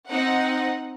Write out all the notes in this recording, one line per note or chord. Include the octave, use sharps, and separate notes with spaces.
C4 D#4 F#5